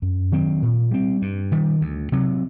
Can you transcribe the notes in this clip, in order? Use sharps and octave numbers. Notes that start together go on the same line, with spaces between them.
F#2
D#3 F#3 C4
A#2
G3 C4
G2
D#3 G3
D2
C3 F#3